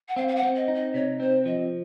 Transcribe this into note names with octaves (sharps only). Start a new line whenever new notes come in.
F#5
C4 F5
F5
F#5
C4
D#5
D#4
D#5
C3 C#5
C4 C5
F3 D#5